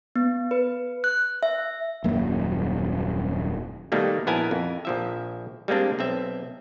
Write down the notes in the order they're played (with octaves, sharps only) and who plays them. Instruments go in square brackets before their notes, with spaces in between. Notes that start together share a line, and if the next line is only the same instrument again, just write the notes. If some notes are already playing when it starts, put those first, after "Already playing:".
[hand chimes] B3
B4
F#6
E5
[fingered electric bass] D#1 F#2 A#3
[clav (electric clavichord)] B2 D#3 G3 A3 A#3
A#1 B3 E4 A#4 G#5 A5
F2
A#1 F3 E5
G3 G#3 A#3 C4 D4
B1 C4 E5